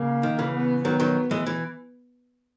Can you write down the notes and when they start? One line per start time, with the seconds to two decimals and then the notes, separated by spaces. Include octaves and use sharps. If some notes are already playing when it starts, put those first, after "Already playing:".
Already playing: C#3 A#3
0.23 D#3
0.39 C#3 E3
0.54 B3
0.84 D#3 F#3 B3
1.00 D#3 F#3
1.31 E3 G#3
1.46 E3